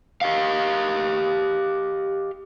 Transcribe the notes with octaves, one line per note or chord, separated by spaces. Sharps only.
G4 D#5 F5